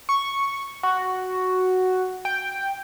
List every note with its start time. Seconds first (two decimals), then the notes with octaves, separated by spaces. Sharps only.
0.09 C#6
0.83 F#4
2.25 G5